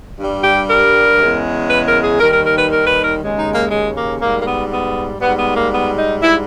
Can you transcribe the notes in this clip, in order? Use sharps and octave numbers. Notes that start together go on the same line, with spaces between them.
G2 G3
G4
A#4
E2 C#3 G#3
B4
A#4
G#4
D#2 D#3 G3 A#4
A#4
A#4
B4
A#4
B4
A#4
D#2 C#3 G#3
D#4
A#3
G#3
A#3
G#2 G3 A#3
A#3
B3
B3
G#2 G3 B3
B3
A#3
B3
D#4
G#2 G3 E4